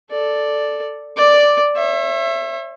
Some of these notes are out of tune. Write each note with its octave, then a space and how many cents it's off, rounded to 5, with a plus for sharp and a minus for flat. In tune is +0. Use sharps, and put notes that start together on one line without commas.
A4 +0 D5 +0
D5 +0 D6 +0
C#5 -40 E5 +20